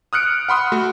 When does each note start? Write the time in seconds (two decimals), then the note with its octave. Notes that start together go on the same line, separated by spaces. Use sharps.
0.13 D#6 F6 F#6 C#7 D7
0.49 F#5 B5 C6 D#6
0.72 A3 F#4